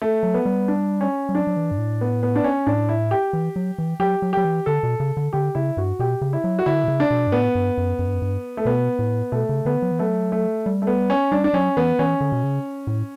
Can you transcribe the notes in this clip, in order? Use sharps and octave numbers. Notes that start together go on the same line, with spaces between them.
A3
F#3
B3
G3
D4
C#4
G3
F#3 D4
F#3
E3
G2
A2
B3
B3
D4
C#4
A2 D4
E4
G4
E3
F#3
E3
F#3 G4
F#3
F#3 G4
E3
D3 A4
B2
C#3
D3
D3 G4
C#3 E4
G2 F#4
B2 G4
C#3
E4
F#3
F#4
D3 E4
B2
C#3
D4
B2
G2
A2 B3
G2
F#2
F#2
G2
F#2
G2
A3
B2 B3
A2
B2 A3
C#3
D3 B3
F#3
E3
F#3 A3
A3
G3
A3
B3
C#4
G3 D4
D4
F#3 C#4
E3 B3
E3 C#4
D3
B2
C#3
A2